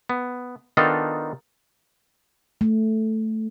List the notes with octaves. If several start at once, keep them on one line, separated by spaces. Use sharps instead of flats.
B3
D#3 B3 D4 D#4 F4 A4
A3